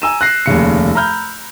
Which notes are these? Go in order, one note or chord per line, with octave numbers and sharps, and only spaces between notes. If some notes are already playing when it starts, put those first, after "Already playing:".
G#5 A#5 E6 D#7 E7
F#6 A#6 C7
F1 D#2 C#3 C#7
A#5 B5 F6 G6